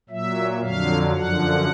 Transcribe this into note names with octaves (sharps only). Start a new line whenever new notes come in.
A#2 F#3 E5
F2 D3 F#3 F5
F#2 D3 F3 F#5